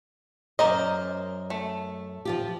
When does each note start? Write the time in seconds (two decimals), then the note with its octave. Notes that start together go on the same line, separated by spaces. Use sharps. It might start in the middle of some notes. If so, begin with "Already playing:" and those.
0.59 F#2 A#4 C5 D5 D#5
1.50 A3
2.25 F3 F4 G4